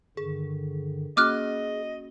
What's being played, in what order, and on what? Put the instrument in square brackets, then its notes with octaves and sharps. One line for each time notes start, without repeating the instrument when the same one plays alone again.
[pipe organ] G2 D3 D#3 [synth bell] G#4
[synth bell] A#3 C#4 F#4 [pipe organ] G#4 [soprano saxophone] D#5 [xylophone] D6 F6 F#6